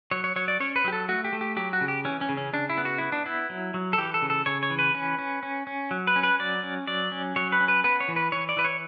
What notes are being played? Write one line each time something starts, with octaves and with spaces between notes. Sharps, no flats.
F#3 C#5
C#5
F#3 C#5
D5
C#4 C#5
B4
F#3 G4
A4
A3 F#4
G4
A3
G4
F#3 G4
F#4
C#3
G4
E3 C#4
C#4
C#3
C#4
C#3 D4
E4
B3
F#4
B3 E4
D4
B3 E4
F#3
F#3
A4
E3 G4
A4
C#3
A4
C#3 C#5
C#5
E3
B4
C#4
C#4
C#4
C#4
F#3
B4
C#4
B4
F#3 D5
C#4
F#3 D5
C#4
F#3 C#5
B4
C#4
B4
B3 B4
C#5
E3
B4
E3 C#5
D5
E3 B4
C#5